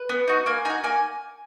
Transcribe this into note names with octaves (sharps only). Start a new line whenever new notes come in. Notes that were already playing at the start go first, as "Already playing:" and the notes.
Already playing: B4
B3
D#4 F#4
A#3 G#5
D#4 F#4 G#5
A#3 G#5